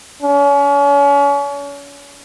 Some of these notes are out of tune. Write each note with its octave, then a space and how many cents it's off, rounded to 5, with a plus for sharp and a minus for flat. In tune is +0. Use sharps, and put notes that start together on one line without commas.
C#4 +35